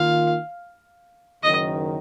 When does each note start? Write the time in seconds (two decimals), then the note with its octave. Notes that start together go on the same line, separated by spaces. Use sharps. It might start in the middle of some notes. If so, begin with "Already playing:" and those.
Already playing: D#3 A#3 F4 F5
1.43 F#1 F#2 D#3 D#5